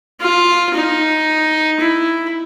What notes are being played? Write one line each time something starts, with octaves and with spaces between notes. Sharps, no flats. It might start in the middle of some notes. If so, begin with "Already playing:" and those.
F4
D#4
E4